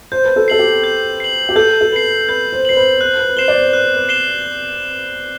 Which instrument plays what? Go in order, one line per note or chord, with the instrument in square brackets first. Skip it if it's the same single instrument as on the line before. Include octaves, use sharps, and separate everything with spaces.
[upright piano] C5 [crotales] G6
[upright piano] B4
A4
[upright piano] A4 [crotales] C7 F#7
[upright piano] G4
[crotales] G6
C7 F#7
[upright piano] G4
[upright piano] A4 [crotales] G6
[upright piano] A4
[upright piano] B4 [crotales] C7 F#7
[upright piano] B4 [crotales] G6
[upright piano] C5
[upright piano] C5 [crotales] C7 F#7
[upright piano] B4
B4
[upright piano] C5 [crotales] F#6
[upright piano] B4
B4
[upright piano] C5 [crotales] C7 E7 G7
[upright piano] D5
C5
[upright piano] B4 [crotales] F#6
[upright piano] C5
B4
[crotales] C7 E7 G7